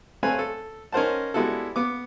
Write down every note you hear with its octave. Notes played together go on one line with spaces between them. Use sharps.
A3 C4 B4 C#5 F5 G#5
A4
C#4 D#4 A#4 C5 F#5 A5
G3 G#3 B3 E4 F#4 A4
B3 D6